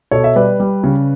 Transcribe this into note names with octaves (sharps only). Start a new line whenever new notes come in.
B2 A4 C#5
E5
G3 B4 D5
G3
C#3